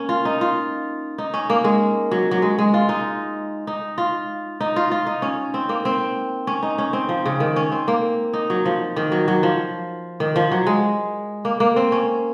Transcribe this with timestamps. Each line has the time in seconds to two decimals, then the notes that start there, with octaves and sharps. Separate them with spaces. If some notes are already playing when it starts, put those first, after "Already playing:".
Already playing: A#3 C#4
0.09 F4
0.25 D#4
0.41 F4
1.18 D#4
1.34 C#4
1.50 A#3
1.64 G#3
2.12 F#3
2.31 F#3
2.42 G#3
2.59 G#3
2.74 F4
2.89 D#4
3.67 D#4
3.98 F4
4.61 D#4
4.76 F4
4.92 F4
5.07 D#4
5.22 C#4
5.54 C4
5.69 A#3
5.85 C4
6.47 C#4
6.63 D#4
6.78 C#4
6.93 C4
7.09 F3
7.26 C#3
7.40 D#3
7.56 C#4
7.72 C4
7.88 A#3
8.33 D#4
8.50 F#3
8.66 F3
8.96 D#3
9.12 F#3
9.28 F#3
9.43 F3
10.20 D#3
10.36 F3
10.52 F#3
10.67 G#3
11.45 A#3
11.60 A#3
11.76 C4
11.92 C#4